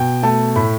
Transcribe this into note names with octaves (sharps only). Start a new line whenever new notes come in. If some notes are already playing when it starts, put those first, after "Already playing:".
Already playing: B2 G5
A3 A5
A2 B5